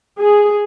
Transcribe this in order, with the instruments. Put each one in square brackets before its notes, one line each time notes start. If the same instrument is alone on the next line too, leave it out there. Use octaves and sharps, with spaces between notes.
[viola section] G#4